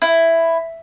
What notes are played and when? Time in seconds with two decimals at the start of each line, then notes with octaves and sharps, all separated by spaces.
0.02 E4